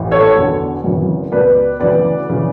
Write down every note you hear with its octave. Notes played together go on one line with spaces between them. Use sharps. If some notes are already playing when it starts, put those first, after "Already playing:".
Already playing: A1 A2 E3
A4 C#5
E1 E2 D3
G#1 F#2 C#3 E3
C#2 B2 B4 D5
D2 C#3 E3 B4 D5
C#3 E3